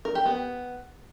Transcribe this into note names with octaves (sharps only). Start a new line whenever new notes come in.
A#4
G4
B3